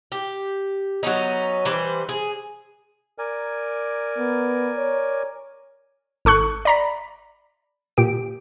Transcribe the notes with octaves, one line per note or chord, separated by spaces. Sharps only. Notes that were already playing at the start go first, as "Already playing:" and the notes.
G4
F#3 B3 C#4 D#4
E3 G3 B4 C5
G#4
A#4 D5 G#5
B3
C#5
G#1 A4 C#6 F#6
D5 A#5 B5
A#2 G4 D7